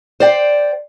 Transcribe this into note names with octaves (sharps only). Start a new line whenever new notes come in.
C5 D5 G5